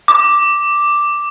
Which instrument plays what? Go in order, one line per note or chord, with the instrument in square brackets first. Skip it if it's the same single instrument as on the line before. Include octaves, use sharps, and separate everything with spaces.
[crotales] D6